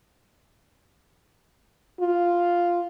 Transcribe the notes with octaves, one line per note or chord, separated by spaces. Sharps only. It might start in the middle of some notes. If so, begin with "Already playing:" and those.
F4